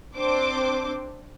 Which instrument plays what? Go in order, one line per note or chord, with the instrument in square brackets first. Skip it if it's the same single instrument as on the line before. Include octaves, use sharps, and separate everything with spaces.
[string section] C4 D4 C5 D6